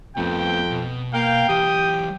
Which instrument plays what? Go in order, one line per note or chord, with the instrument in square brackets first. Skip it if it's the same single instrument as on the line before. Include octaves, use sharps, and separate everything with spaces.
[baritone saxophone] F2 [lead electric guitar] A3 B3 [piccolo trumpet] G5
[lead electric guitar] B2
[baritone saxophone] A#3 [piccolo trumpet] F5 [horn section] G5
[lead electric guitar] E3 F#3 [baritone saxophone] G4 [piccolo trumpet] D#6